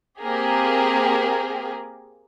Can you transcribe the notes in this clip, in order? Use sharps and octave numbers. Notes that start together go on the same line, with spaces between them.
A#3 C4 G4 G#4 A#4